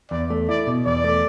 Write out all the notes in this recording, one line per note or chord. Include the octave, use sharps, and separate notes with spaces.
E2 D5
A3
E4 D5
B2
E2 D5
A3